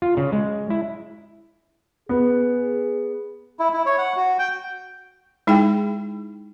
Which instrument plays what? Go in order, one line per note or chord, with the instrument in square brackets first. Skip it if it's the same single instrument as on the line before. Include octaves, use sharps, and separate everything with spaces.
[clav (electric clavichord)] F4
C#3
G#3
E4
[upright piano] B3 [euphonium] G#4
[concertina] E4
E4
C#5
F#5
F#4
G5
[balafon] G#3 D#4 E4 G#4 G5